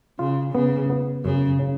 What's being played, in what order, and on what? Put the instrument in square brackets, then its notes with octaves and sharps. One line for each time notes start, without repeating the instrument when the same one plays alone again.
[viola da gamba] C#3 [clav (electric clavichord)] F4
[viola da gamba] C#3 [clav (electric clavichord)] B3
[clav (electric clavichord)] B3
[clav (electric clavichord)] F#2 [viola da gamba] C#3
[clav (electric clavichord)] C#3